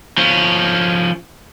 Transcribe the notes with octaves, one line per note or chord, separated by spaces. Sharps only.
F3 C#4